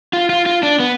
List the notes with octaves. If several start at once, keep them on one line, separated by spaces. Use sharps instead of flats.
F4
F4
F4
D4
B3